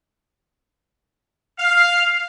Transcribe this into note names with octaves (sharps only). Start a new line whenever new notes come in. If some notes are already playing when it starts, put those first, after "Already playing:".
F5